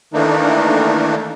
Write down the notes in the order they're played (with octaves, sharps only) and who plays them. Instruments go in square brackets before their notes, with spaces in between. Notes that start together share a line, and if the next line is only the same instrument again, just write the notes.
[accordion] D#3 E3 A3 A#3 D4 D#4